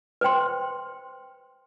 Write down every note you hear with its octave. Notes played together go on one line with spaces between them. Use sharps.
B4 C5 G5 C6